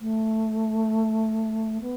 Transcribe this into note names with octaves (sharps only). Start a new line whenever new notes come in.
A3
B3